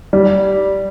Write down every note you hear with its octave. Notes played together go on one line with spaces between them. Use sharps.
G3